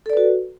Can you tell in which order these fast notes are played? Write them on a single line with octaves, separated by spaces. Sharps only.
A4 D5 B4 F#4